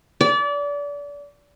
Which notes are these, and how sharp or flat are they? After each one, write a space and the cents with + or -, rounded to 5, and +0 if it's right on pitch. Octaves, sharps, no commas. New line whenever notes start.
D5 -30